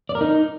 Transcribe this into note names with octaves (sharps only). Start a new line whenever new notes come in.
D5
A#4
D#4